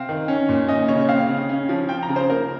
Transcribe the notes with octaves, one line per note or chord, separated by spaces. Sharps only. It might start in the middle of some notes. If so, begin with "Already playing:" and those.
Already playing: C3 C4 F5
D#3
C#4
A#2
C#4 D#5
C#3 C#5
C4 F5
C#3
C#4
F3
C4 G5
A#5
C#3
C5
A#3 A#4